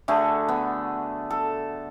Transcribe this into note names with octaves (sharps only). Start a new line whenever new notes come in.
D3 A3 F#4 G#4
B3
A4